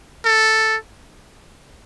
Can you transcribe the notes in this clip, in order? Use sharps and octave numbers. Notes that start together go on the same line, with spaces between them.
A4